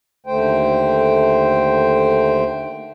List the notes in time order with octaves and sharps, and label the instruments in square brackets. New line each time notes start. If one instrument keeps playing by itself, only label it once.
[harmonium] D#2 D3 A3 C5 G5